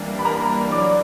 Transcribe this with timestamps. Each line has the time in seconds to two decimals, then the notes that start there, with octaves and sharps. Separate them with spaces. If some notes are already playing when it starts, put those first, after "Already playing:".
Already playing: E3 G3 A#3 D4
0.19 B5
0.25 A#4 A#5
0.71 F#3 A#3 D5 D6